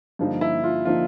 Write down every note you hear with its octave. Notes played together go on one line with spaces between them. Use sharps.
G2 D3 F3 A#3 D#4
E4
F4
D3 F3 A#3 D#4 F4